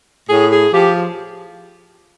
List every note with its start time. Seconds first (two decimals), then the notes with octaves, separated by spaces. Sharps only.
0.29 A2 G#4
0.51 G#4
0.72 F3 G4